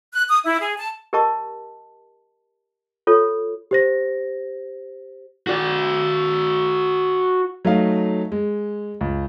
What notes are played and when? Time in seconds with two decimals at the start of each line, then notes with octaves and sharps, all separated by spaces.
0.13 F#6
0.28 D#6
0.44 E4
0.60 G#4
0.78 A5
1.13 G4 A#4 D#5 A5 C#6
3.07 F4 A4 C#5
3.71 G4 C5 A#6
5.47 F#4 D5
7.65 F#3 A3 D#4 F5
8.32 G#3
9.01 C#2